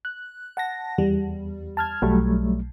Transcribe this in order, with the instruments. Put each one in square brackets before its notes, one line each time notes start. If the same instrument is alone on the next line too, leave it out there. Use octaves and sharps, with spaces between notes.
[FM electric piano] F#6
F#5 A5 A#6
[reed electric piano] E2 [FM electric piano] G3
[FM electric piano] A5 F6 G#6
[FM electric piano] B1 [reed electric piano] F#3 G3 A3